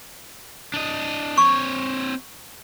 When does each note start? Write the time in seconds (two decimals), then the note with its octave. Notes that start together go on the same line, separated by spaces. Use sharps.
0.74 D4 D#5
1.38 C4 C#5 C#6